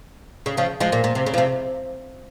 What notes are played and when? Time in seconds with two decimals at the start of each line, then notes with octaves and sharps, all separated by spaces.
0.46 C#3
0.57 C#3 F3
0.80 F3 G#3
0.92 A#2
1.04 A#2
1.15 C3
1.26 C#3
1.34 F3
1.38 C3